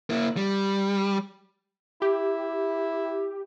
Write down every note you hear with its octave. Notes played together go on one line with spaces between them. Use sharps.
A#3 E4
G3
E4 G4